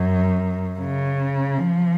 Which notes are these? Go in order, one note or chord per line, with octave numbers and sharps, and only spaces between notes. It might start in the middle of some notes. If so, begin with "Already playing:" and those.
Already playing: F#2
C#3
F3